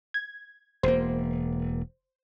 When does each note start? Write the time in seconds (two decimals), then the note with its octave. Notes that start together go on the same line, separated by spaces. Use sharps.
0.14 G#6
0.83 E1 A#3 C5